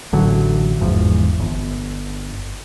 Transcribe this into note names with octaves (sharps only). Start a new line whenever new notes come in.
A1 D3 F#3
G1 E2 G#2 F3
G1